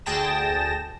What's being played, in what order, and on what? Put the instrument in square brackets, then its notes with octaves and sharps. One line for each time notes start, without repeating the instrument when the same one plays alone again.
[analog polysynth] D2 G#4 G5 A5 A#6 E7